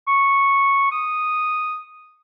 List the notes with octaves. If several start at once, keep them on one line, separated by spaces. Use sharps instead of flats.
C#6
D#6